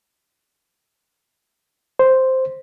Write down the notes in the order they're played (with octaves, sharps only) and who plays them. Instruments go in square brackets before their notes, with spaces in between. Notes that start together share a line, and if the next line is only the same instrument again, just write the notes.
[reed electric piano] C5